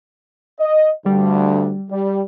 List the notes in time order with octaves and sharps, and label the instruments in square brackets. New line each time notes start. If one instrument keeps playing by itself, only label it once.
[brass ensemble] D#5
[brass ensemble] D2 G2 D3 [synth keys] G3
[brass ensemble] G3